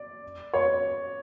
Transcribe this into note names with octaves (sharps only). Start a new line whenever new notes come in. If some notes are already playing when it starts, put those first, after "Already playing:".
Already playing: D5
C#5